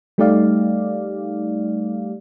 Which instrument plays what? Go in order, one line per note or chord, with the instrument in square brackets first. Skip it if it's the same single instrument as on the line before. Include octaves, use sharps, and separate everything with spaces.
[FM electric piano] G3 A3 D#4 G4 D5 F5